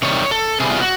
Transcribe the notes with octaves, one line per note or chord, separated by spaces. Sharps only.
C3 D#3 G3 C#5
A4
C3 E3 G3 B3 G#4
F4
F#4